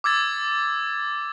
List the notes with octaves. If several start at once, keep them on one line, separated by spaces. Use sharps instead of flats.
D6 E6 G#6 A6